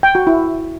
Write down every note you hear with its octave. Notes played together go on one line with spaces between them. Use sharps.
G5
F#4
E4